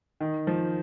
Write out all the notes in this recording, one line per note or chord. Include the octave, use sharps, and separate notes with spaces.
D#3
F3